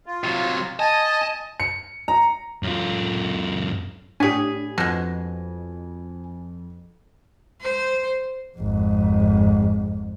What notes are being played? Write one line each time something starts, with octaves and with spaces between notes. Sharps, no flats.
F4
C3 F#3
D#5 G#5 A5
C#7
A#5
F#2 F4
A2 C#4 D4 G4 G#4 G#5 B6
F2 B2 G#3
C5
G#1 F2